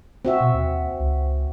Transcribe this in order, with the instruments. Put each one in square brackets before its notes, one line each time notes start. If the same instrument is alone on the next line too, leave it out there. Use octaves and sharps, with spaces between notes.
[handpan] C4 F#4 E5
[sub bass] B2
D#2
C#2